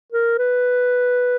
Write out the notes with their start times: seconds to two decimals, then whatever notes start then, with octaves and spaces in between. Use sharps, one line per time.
0.13 A#4
0.38 B4